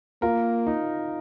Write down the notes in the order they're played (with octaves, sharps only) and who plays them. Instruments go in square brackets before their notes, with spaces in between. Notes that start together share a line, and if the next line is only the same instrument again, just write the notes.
[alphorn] A#3 [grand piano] F4 A#4
[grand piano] D#4